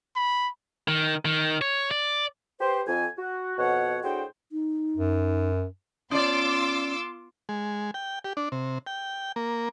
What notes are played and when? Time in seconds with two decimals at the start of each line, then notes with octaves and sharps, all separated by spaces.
0.16 B5
0.88 D#3
1.25 D#3
1.61 C#5
1.91 D5
2.60 G4 B4 C5
2.87 F2 G#5
3.18 F#4
3.58 F2 B2 C#5 F#5
4.04 A2 D4 F#4 G#4 C5 G5
4.52 D#4
4.97 F#2
6.11 B3 C#4 F4 D5 C6 D6 E6
7.49 G#3
7.94 G5
8.24 G4
8.37 D4
8.52 C3
8.87 G5
9.36 A#3